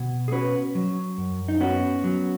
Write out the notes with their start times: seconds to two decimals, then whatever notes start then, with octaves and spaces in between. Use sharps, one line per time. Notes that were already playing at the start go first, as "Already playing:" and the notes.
Already playing: B2
0.28 G#4
0.32 C#4 F#4 B4
0.75 F#3
1.18 F#2
1.48 D#4
1.61 B3 C#4 F#4
2.04 F#3